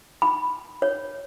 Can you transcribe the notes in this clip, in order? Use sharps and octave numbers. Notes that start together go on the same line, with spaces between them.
B5
C#5